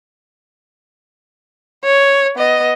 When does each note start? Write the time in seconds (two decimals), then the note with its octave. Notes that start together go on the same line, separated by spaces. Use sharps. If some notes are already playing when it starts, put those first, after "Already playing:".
1.84 C#5
2.36 B3 D#5